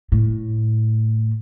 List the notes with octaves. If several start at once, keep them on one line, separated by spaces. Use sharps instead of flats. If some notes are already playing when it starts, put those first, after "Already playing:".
A2